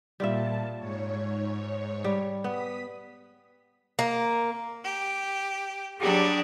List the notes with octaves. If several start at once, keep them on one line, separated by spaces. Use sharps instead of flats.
A#2 G3 F4 E5 A5
G#2 C#5
G3
B3 D#6 B6
A#3
G4
F#3 G3 D4 G4 G#4